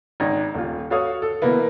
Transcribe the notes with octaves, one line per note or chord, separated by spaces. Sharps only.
G#1 D#4
D#1 F4
F#4 A4 C#5 F5 D#6
A4
B2 E3 A#3 B3